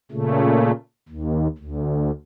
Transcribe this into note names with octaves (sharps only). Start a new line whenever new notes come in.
A#2 C#3 A3
D#2
D2